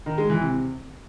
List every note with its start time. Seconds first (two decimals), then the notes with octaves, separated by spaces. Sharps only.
0.06 D#3
0.18 G#3
0.30 E3
0.41 C3